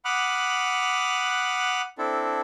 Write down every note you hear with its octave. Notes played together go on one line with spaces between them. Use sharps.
F#5 B5 D6 D#6 F6 F#6
C4 D4 E4 A4